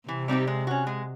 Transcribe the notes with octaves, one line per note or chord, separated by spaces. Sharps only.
C3 E3
G3 C4 D#4 G4
G#3
C#4 F#4
G#3